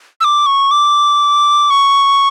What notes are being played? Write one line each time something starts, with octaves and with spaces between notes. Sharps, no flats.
E6
D6
C#6
D6
C#6